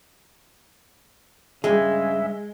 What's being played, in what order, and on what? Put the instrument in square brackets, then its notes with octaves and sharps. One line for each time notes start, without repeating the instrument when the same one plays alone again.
[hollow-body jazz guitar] G2 G#4 [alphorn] C#3 [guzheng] G#3 [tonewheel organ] E5